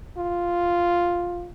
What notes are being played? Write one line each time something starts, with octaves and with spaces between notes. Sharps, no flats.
F4